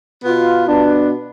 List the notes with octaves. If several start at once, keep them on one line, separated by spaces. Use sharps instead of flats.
B2 B3 F4
B2 B3 D4